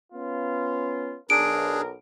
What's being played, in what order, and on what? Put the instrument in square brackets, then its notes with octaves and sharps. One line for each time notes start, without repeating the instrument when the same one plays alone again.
[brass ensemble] B3 C#4 F4
[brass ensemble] B1 A#4 [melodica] D4 G#4 [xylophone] D7